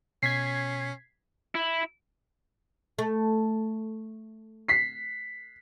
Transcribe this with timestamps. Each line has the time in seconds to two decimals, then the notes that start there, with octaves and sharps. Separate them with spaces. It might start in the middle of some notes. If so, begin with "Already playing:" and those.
0.23 B2 C#4 G#6 B6 C7
1.55 E4
2.99 A3
4.68 B6 C7